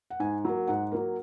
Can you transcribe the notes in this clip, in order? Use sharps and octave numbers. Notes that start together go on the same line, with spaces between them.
F#5
G#2 G#5
F#3 A#3
G#2 F#5
F#3 A#3